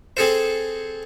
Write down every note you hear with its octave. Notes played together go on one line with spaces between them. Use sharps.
C4 G#4 A4 C5